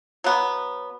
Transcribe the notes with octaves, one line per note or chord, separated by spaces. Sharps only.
F#3 B3